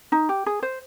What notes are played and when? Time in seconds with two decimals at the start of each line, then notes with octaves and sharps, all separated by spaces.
0.12 D#4
0.29 G4
0.46 G#4
0.63 C5